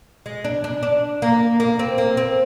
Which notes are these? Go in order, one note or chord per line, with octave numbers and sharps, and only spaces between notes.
G#3
D4
D4
D4
A#3
A#3
C4
A#3
C4